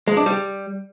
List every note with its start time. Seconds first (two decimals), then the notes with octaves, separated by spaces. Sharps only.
0.08 G#3
0.17 D4
0.26 G3